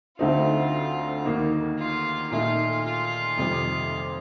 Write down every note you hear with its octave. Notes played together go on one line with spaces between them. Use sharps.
D2 D3 A3 C4 D#4 F4
D#2 D#3 A#3 D#4
F4
A#2 A3 D#4 F4
F4
F2 C3 D#3 G3